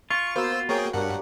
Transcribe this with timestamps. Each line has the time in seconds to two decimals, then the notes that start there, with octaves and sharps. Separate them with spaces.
0.11 F4 C6 C#6
0.36 A#3 B3 F#4 C5 E6
0.69 A#3 G#4 A#4 C5 C#5 G5
0.93 G2 D4 G4 A#4 F#5